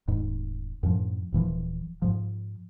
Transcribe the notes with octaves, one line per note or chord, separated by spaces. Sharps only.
D#1 G#2
F#2 A2 F3
D#1 A#2 E3 F3
G#2 F3